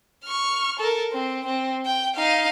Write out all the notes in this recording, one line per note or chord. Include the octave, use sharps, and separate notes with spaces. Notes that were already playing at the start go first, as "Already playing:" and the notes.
C#6 F6
A4 A#4
C4
C4
G5
D#4 F5